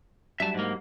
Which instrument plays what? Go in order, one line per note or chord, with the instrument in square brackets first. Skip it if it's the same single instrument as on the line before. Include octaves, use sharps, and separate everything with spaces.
[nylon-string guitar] F#3 G3 D4 [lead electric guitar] E5 A5
[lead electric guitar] G#2 A#3